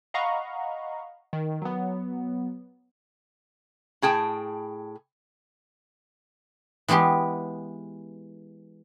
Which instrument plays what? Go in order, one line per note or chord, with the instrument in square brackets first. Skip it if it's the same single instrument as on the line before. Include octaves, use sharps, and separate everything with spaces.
[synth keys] D#5 F5 F#5 A#5 B5 C#6
D#3
F#3 B3
[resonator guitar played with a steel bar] A2 G#4 G5 A5
[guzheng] E3 G#3 B3 G4 C6